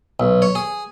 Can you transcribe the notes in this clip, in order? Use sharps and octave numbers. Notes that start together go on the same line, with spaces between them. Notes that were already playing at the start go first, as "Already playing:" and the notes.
B1
C#5
G#4